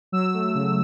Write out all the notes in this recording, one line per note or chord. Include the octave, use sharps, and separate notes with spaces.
F#3 E6
A3
C#3